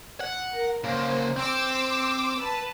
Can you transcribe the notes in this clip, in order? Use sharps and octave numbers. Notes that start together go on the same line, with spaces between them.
F#5
A#4
C#3 A#3 C5
C4 C6 D6 E6
B4 A5